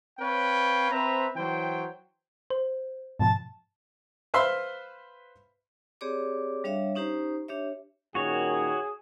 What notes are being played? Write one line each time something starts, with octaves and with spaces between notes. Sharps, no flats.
C4 B4 C#5 F5 G5
C4 B4 C5 E5 A#5
E3 F#3 C5 G5
C5
G#2 B2 F3 A5
B4 C5 E5 F5 B5 C6
C4 G4 G#4 C#5 D5 D6
G3 D4 C#5 E5 F5
C#4 D#4 G4 C5 A#5
D4 G4 C#5 E5
A#2 D#3 C#4 F#4 G#4 C#5